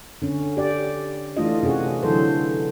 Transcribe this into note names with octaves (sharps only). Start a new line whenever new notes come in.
D3 C#4
G4 D5
E3 A3 D4 F4 D#5
C3 C#4 F#4 G#4
D3 E3 F#3 A4 C5